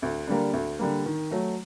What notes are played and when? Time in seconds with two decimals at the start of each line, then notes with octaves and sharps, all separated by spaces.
0.02 D2
0.28 D3 G3 A#3
0.53 D2
0.79 D3 G3 A#3
1.06 D#3
1.31 F#3 A3